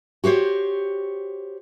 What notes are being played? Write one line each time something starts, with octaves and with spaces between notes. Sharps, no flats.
F#4 G4 C5 C#5